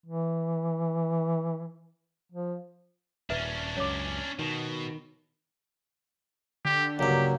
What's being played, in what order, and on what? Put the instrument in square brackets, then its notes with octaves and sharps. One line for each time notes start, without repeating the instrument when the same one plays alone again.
[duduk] E3
F3
[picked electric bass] D#1 [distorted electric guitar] C#4 D4 [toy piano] B4 E5
[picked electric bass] C#2 F#2 [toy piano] C#5 D6
[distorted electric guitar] B2 [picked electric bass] D#3
[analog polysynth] D3 [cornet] G4
[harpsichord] C#2 G2 [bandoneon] F#3 A#3 [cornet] G4